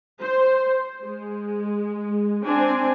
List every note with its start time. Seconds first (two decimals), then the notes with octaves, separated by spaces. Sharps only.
0.22 C5
1.03 G#3
2.44 C4 D4 G#5